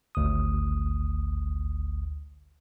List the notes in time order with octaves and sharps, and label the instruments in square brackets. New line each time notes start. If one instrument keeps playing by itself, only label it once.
[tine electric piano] G#1 D2 D#6